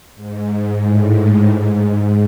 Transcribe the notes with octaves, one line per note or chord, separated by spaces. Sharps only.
G#2
A2
G#2